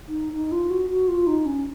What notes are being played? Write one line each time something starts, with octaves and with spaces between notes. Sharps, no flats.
D#4
D#4
F4
F#4
F#4
F4
D#4
C#4